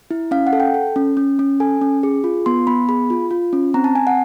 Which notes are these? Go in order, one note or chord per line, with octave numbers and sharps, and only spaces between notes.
E4
C#4 F5
F#5
A4
G5
A4
C#4
C#4
C#4
A4 G#5
C#4
G#4
F4
B3 C6
B3 B5
G#4 B5
F4
F4
C#4
C4 A#5
A5
C4 G#5
F#5